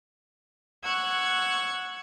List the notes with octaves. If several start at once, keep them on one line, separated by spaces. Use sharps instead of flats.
F#5 C#6 E6 F#6 G#6